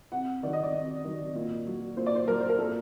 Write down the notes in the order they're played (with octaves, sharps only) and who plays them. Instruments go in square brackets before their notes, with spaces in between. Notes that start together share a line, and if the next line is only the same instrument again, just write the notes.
[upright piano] C3 F#5
D#3 F#3 D5
D#5
D5
C3
D#3 F#3
A#2
F#3
A#2 C5
D5
C5
F#3 A#4
C5
A#4
A#2 A4